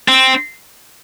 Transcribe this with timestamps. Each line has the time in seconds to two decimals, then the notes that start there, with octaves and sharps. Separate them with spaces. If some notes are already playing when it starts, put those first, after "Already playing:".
0.08 C4